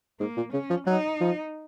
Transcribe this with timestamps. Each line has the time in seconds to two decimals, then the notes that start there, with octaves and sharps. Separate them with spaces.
0.20 G#2 A#3
0.37 A#2
0.53 C#3 C#4
0.70 F3
0.87 F#3 D#4
1.21 F3